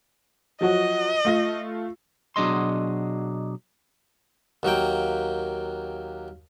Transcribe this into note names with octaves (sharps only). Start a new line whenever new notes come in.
F3 F#3 F#4 D#5
A3 F4 A#6
B2 F#3 D4 G#4 D#5 C6
D#2 F#3 A#3 G5